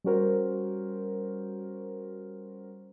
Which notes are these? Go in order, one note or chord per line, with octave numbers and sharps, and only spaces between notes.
G3 C#4 F#4 A#4 C5